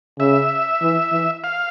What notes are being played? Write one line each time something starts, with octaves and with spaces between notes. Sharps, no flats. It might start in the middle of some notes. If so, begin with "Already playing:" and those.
C#3 E5
E3
E3
F5